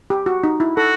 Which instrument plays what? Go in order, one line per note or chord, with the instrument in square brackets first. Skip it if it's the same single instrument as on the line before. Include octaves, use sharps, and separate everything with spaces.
[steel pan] G4
F#4
D#4
E4
[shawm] F#4 [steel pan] A4